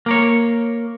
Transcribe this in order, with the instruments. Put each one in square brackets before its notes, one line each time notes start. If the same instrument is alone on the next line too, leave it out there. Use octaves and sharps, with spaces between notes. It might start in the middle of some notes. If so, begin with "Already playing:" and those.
[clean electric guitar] A#3 A#4 C#5